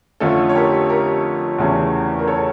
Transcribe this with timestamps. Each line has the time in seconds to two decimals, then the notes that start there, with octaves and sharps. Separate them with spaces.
0.20 F2 D3 A3 C#4 F4 A4
0.49 C#5
0.55 G4 A#4
0.89 G4 A#4
1.58 E2 C#3 E3 A3 C#4
2.19 A#4
2.27 A4 C#5